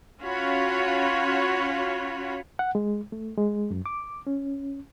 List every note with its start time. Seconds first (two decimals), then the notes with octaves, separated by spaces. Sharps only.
0.21 C#4 F4 F#4 C#5 B5
2.59 F#5
2.75 G#3
3.12 A3
3.37 G#3
3.70 F#2
3.86 D6
4.27 C#4